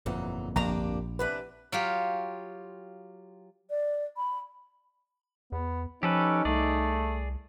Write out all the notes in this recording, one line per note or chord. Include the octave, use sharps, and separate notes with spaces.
G1 F2 A#2 E3 F#3 D#4
A#1 A#3 D4 G4 A#5
C3 E3 D4 B4
F#3 F4 G4
D5
B5
E2 B3
F3 C#4 D#4 G4 A4 B4
C2 A3 G#4 D5